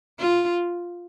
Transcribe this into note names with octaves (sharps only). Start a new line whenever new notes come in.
F4